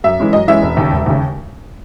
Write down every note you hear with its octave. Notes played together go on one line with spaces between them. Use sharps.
F#2 E5
E3 G#3 C#4
F#2 D#5
E3 G#3 C#4 E5
E1
D#2 C#3
E1
D#2 C#3